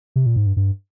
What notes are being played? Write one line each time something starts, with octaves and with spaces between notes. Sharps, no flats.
C3
A#2
G#2
G2
G2